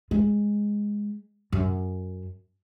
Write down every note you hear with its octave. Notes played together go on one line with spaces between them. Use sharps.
G#3
F#2